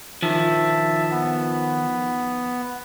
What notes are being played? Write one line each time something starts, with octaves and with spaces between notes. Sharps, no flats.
D#3 F3 E5 A5
B3